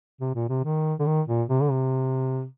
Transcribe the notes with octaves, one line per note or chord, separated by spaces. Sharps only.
C3
A#2
C3
D#3
D3
D#3
A#2
C3
D3
C3